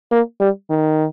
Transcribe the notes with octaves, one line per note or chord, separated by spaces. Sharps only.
A#3
G3
D#3